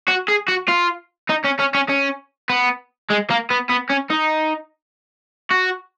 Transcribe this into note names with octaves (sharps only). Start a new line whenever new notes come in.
F#4
G#4
F#4
F4
D#4
C#4
C#4
C#4
C#4
B3
G#3
A#3
B3
B3
C#4
D#4
F#4